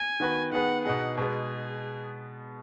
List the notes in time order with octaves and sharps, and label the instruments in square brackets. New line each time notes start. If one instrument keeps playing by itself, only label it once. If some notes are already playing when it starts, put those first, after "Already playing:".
Already playing: [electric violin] G#5
[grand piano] D#3 B3 F#4 B4
[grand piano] D#3 B3 G#4 B4 [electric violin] F#5
[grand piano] B2 B3 D#4 G#4 [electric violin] F#5
[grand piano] B2 G#3 B3 [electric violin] G#4